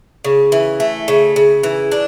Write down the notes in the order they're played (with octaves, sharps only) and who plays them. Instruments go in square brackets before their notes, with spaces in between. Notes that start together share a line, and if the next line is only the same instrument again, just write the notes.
[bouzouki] C#3
E3
A3
C#3
C#3
E3
D4